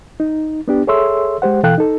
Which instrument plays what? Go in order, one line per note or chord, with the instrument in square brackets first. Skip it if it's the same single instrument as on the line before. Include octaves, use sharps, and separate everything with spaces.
[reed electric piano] D#4
B3 D4 G4
G#4 A4 C#5 E5 C6 E6
G#3 G4 C5 F#5
B2 E3 A4 F5 G5 F#6
D#4 A4